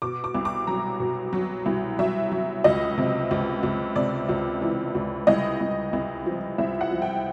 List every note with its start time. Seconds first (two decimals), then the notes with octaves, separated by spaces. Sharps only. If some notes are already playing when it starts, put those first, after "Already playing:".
0.02 B2 D6
0.24 D6
0.35 C2
0.45 D6
0.67 F#3 A#5
1.00 B2
1.33 F#3
1.66 C2
1.99 F#3 E5
2.32 F#3
2.64 C#2 D#5
2.98 C3
3.31 C#2
3.63 C#2
3.96 C3 D5
4.29 C#2
4.62 E3
4.95 C#2
5.27 C2 D#5
5.60 C2
5.93 C2
6.26 F3
6.58 C2 E5
6.81 F#5
6.91 F3
7.02 G5